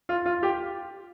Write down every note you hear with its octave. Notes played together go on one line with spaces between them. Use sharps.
F4
F4
F4 G4